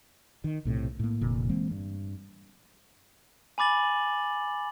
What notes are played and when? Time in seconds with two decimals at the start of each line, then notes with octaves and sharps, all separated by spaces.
0.44 D#3
0.65 B1 A2 C3
0.99 A2 A#3
1.21 F1 A#2 D3
1.49 E3 G#3 A#3 C4
1.71 G2
3.58 G#5 B5 D6 A6 F#7